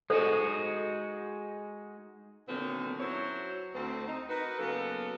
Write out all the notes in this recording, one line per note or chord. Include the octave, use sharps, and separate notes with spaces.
G#3 D#4 F#4 A4 C5
A#2 D3 D#3 F#3 B3 C4
F#2 F#3 E4 C5 C#5
D2 C4
D#4
D#4 F#4 A#4 B4
C#3 F#3 A#3 B3 A4